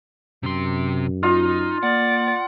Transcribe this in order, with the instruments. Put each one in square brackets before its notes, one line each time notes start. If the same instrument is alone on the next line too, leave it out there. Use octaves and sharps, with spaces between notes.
[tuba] F#2 [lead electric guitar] C3 C6
[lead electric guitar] D#4 [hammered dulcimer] F4
[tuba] A#3 [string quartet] D5 [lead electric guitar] F#5